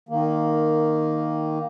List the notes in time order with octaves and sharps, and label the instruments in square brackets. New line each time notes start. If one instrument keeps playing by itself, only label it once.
[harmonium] D#3 A#3